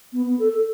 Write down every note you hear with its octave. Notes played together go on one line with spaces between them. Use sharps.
B3
B3
A4
A4